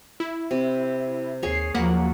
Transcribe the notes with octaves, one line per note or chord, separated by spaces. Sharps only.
E4
C3
D#2 G#4 C#5 C7
D#2 F3 F#3 A#3 F#5 B5